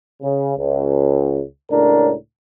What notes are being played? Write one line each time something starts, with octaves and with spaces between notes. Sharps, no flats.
C#3
C#2
C#2 A2 D4 A#4